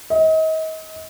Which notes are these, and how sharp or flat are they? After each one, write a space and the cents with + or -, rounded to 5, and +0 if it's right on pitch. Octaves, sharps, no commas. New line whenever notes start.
D#5 +35